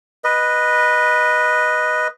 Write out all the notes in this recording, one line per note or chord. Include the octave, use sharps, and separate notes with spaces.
B4 D#5